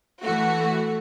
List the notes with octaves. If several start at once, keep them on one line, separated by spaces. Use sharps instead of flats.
E3 A3 F#4